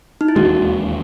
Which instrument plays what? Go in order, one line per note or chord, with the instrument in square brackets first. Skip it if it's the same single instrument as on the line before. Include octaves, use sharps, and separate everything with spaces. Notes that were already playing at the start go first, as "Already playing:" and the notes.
[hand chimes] D#4
E4
[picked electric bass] E1 D#2 D#3 G#3 [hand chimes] F#4